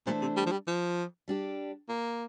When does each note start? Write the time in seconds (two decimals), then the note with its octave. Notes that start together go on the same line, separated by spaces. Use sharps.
0.06 A#2 E3 A3 D4 A4 C5
0.22 C3
0.37 G3
0.47 F3
0.52 G3
0.68 F3
1.28 G3 D4 G4
1.89 A#3